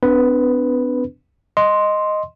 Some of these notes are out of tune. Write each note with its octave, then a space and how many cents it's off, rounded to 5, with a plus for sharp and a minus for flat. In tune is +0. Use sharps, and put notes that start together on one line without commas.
B3 +45 D4 -10 B4 +0
D#5 +0 C6 +0